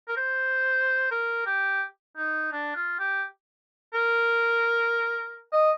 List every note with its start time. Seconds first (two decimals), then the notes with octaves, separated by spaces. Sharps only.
0.08 A#4
0.17 C5
1.11 A#4
1.46 G4
2.17 D#4
2.52 D4
2.76 F4
2.99 G4
3.94 A#4
5.53 D#5